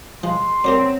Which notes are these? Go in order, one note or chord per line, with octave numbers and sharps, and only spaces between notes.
F3 G#3 C6
F#3 C4 G4 A#4 D5